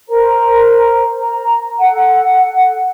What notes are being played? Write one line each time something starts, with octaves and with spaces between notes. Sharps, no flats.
A#4 C5 A#5
A#5
A4 F#5